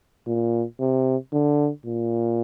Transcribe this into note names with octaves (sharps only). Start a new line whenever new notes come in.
A#2
C3
D3
A#2